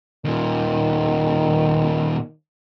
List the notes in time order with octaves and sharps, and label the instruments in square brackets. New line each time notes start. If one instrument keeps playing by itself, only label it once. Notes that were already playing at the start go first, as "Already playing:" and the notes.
[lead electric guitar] D#2 A#2 [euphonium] D#3